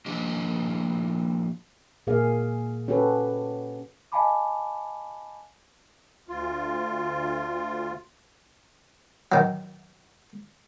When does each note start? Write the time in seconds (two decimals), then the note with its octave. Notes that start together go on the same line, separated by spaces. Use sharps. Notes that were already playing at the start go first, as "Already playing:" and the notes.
0.06 F3 A#3 D4 G4 D#5
2.07 A#2 A#3 G#4 F5
2.88 C#4 F#4 G4 A4 B4
4.12 D#5 F5 G#5 A5 B5 D6
6.28 D2 F4
9.32 D#3 F#3